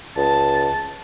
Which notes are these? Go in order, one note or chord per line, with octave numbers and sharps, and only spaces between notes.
C#2 A5